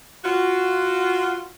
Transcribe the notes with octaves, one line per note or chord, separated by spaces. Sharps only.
F4 F#4